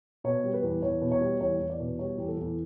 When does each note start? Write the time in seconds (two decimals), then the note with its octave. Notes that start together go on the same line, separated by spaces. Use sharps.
0.24 B2 C#5
0.44 G3
0.54 B4
0.63 E2
0.82 E2 C#5
1.01 B2
1.11 C#5
1.21 G3
1.41 E2 C#5
1.60 E2
1.70 D5
1.80 B2
1.99 G3 C#5
2.18 E2 G4
2.28 A4
2.37 E2